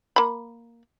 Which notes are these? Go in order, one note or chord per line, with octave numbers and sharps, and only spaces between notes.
A#3 B5